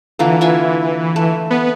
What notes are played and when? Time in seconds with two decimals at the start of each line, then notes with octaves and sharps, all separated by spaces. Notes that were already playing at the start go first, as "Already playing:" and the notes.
0.19 D3 E3 A#3 F4
0.41 F4 E5 G#5
1.16 A3
1.51 B3